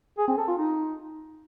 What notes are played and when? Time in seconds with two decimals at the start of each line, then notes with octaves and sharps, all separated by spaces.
0.18 G#4
0.28 C4
0.38 A4
0.48 F4
0.58 D#4